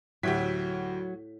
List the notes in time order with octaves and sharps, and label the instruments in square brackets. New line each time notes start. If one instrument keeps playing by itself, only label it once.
[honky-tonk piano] D2 G4 B6 [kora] A2 [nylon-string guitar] F#3